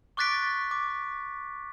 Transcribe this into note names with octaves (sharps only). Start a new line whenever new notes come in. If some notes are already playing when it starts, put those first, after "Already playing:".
C#6 D6 F#6 A6 B6 D7
D6